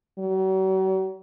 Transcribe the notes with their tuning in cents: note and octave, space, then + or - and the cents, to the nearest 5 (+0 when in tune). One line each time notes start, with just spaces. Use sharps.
F#3 +45